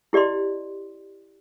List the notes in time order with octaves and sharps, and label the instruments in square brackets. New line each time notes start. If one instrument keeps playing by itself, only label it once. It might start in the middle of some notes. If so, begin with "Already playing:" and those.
[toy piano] E4 G4 D5 D#5 C6